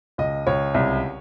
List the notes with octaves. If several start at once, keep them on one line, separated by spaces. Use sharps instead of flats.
C#2 D#5
C#2 C#5
C2